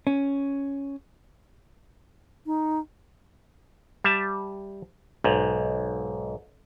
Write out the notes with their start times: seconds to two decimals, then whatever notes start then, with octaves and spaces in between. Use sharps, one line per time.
0.07 C#4
2.46 D#4
4.04 G3 E5 A5
5.24 B1 G#2